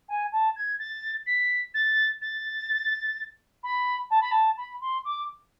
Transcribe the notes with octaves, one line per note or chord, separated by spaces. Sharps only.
G#5
A5
G#6
A6
B6
A6
A6
B5
A5
B5
A5
B5
C6
D6